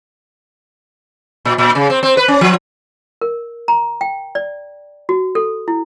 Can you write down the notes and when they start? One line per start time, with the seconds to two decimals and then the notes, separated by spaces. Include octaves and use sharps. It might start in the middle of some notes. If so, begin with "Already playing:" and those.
1.45 A#2
1.58 A#2
1.75 C#3
1.90 C4
2.03 C4
2.17 B4
2.28 C#4
2.41 F3
3.21 A#4
3.68 A#5
4.01 G5
4.35 D5
5.09 F#4
5.35 A4
5.68 E4